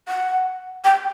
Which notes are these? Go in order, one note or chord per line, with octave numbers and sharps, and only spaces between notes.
F#5
G5